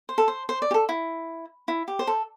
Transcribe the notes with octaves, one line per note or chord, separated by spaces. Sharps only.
C5
A4
C5
C5
D5
G4
A4
E4
E4
G4
C5
A4